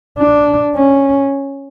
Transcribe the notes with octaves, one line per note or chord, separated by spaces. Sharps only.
D4
C#4